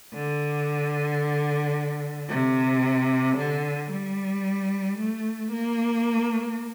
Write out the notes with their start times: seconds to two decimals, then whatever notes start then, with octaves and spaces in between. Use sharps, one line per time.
0.14 D3
2.29 C3
3.37 D3
3.91 G3
4.99 A3
5.52 A#3